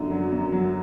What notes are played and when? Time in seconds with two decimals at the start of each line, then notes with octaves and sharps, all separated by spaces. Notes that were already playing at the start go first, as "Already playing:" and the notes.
Already playing: F#2 D3 F#3
0.11 F#3
0.32 F#2
0.52 F#3